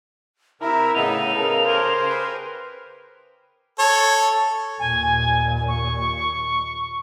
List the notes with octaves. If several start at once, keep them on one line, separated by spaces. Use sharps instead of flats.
C3 E4 A#4 E5 A#5
A2 C#3 B3 D#4 D#5 F7
C#3 A4 A#4
G4 G#4 A#4 C5
B4
A4 C#5
D#2 A#2 G#5
C#6